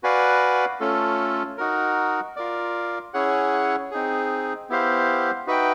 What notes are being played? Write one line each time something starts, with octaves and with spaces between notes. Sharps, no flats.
F#4 B4 D5 F5 G#5
A3 C#4 F4 A4
D#4 F#4 A#4
F4 A#4 D5
C#4 E4 G#4 C#5 F#5
C4 D#4 G#4
B3 E4 G4 C5 F5
D#4 F#4 B4 E5 G5